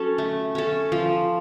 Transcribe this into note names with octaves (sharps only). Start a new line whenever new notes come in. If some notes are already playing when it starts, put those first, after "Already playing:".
Already playing: F#3 C#4 A4
A3
C#4 A4
F3